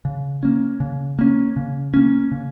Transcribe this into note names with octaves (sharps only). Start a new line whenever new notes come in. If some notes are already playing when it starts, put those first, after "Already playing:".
C#3
A#3 C#4
C#3
A#3 C#4
C#3
A#3 C#4
C#3